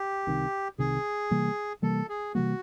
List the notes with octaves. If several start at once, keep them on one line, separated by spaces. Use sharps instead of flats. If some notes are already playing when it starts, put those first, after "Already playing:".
Already playing: G4
C2 C3 D#3
C2 C3 D#3 G#4
C3 E3 G3 A#3
C3 E3 G3 A#3 A4
G#4
C3 E3 G3 A#3 F#4